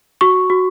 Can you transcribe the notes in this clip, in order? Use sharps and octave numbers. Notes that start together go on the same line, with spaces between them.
F#4 C#6
F#4